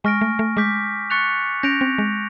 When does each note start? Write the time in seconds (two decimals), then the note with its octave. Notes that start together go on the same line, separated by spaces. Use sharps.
0.04 G#3 G#5 C#6 F6 A#6 D7
0.21 A3
0.39 A3
0.57 G#3 D6 G6 B6
1.10 C#6 F#6 A6 C#7 F7
1.63 C#4 G6 A#6 D7 F7
1.81 C4
1.98 G#3